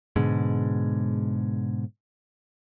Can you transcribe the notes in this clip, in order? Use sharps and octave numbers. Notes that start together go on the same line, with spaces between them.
G#2 B2 D3 G#3